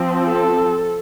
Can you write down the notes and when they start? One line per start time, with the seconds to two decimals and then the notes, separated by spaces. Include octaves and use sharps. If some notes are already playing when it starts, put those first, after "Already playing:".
Already playing: F3 C4
0.24 A4